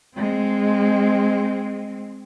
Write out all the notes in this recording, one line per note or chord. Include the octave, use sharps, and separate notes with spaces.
G#3 C4